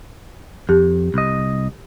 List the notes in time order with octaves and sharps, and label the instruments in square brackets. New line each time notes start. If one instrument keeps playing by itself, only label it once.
[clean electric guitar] F2 [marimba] G4
[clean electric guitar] C2 D#5